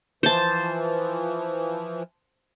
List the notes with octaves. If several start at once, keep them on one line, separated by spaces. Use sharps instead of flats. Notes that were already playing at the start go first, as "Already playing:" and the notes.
E3 F3 C5 A5